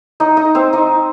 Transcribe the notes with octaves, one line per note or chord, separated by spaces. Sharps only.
D#4 D#5
D#4 D#5
C4 C5
D#4 D#5